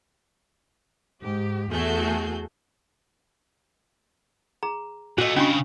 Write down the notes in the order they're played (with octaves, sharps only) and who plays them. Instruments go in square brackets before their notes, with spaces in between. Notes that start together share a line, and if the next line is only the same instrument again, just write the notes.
[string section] G#2 G4
E2 A3 F#4 G#4 A4 G6
[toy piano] G#4 A#5
[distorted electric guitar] A#2 A3 [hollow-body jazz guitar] F#4 D#5
[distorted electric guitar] C#3 E4 [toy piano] C#4 D4 C#6